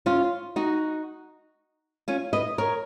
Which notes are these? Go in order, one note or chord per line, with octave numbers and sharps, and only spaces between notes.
C#4 F4
D#4 F#4
C#4 F4
B4 D#5
A#4 C#5